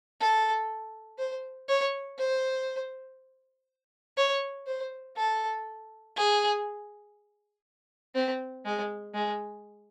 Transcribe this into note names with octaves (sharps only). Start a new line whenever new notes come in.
A4
C5
C#5
C5
C#5
C5
A4
G#4
C4
G#3
G#3